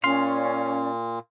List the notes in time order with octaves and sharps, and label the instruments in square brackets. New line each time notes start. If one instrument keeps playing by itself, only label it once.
[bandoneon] A#2 [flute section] C#4 D5 [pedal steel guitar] F5 C6